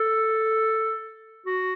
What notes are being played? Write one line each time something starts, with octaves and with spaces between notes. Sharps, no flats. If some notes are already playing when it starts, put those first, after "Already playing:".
Already playing: A4
F#4